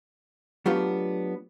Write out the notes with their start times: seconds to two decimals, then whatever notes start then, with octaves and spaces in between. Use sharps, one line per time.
0.66 F#3 A3 B3 D4 F4 G4